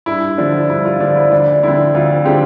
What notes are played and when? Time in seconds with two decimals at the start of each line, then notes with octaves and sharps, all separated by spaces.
0.06 G2 E4
0.38 D3 F3 D4
0.70 G2 E4
0.85 F4
1.00 D3 F3 D4
1.16 E4
1.32 D2 D4
1.54 D4
1.63 D3 F3 C4 E4
1.94 D2 F4
2.25 D3 F3 C4 G4